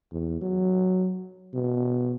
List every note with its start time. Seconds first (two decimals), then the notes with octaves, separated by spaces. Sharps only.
0.12 E2
0.41 F#3
1.54 B2